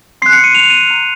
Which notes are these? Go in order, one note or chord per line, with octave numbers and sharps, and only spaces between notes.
C6 F#6 C7
C#7
D#7
F7
D#7
A#5 F6